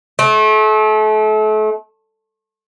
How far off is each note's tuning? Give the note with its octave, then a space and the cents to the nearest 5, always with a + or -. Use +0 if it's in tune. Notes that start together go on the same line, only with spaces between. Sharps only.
A3 -35